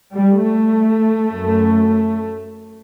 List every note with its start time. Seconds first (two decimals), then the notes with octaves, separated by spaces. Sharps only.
0.13 G3
0.41 A3
1.29 F#2